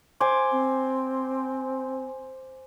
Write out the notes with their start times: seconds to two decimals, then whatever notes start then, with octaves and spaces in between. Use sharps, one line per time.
0.20 C5 G#5 D6
0.52 C4